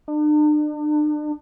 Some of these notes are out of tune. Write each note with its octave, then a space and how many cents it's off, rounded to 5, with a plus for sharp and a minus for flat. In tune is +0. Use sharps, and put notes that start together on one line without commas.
D4 +40